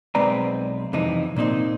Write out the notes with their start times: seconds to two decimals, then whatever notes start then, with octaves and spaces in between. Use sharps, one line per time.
0.15 B1 G#3 C4 B4 D5 A#5
0.93 F2 C3 E3 D#4
1.36 A#2 A#3 C4 D#4